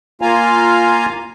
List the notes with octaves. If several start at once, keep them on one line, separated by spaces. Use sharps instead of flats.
A#3 F4 F5 G#5 A#5